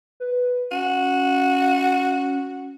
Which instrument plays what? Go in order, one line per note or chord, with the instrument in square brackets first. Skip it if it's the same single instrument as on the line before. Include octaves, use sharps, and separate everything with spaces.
[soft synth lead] B4
[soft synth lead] C#4 [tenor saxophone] F#4